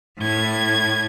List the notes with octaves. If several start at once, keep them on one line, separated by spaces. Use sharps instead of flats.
A2 G#6